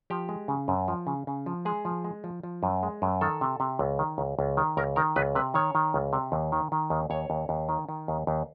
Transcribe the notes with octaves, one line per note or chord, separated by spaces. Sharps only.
F3 G4
G#3
C#3
F#2
F3
C#3
C#3
F3
G#3 G#4
F3
G#3
F3
F3
F#2
G#3
F#2
D#3 A4
C3
C3
C#2
D#3
C#2
C#2
D#3
C#2 A#4
D#3 A#4
C#2 B4
C3 B4
D#3 C#5
D#3
C#2
C3
D#2
D#3
D#3
D#2
D#2 C#5
D#2
D#2
D#3
D#3
D#2
D#2